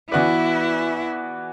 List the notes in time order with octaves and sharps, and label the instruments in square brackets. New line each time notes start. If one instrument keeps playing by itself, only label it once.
[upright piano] E3 B3 F#4 B4 D5 [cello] E4